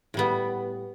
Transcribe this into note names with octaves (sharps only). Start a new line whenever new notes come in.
A2 G3 B3